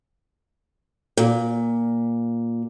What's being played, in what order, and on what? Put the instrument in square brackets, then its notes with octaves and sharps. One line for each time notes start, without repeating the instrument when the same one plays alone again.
[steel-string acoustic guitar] A#2